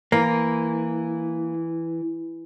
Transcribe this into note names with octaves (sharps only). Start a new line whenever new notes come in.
E3 A#3